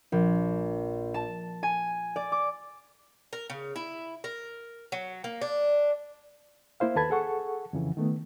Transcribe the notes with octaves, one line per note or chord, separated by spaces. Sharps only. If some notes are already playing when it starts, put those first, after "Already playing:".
A#1
A5
G#5
D5
D6
A#4
C#3
E4
A#4
F#3
A#3
D4
A#3 E4 C5 F5
D#2 A4 B4 A5 B5 G#6
G#4 A4 F#5 C#6
F2 C#3 E3
D#3 A3 B3